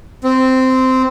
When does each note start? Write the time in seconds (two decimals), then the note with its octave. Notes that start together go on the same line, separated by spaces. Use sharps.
0.24 C4